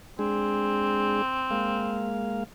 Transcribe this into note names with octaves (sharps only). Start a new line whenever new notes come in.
G#3 C4 D4 G#4
G#3 A#3 F5